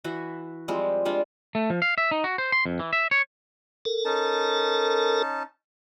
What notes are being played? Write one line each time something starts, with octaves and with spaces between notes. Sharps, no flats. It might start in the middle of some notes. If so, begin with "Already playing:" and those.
E3 F#4 E5
F3 G3 G#3 C4
G3 G#3 D4 F4
A3
F3
F5
E5
D#4
F#4
C5
C6
F2
E3
E5
C#5
A4 A#4
C#4 D#4 A5